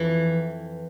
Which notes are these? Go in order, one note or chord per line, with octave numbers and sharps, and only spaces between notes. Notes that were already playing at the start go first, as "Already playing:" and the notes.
Already playing: F2 E3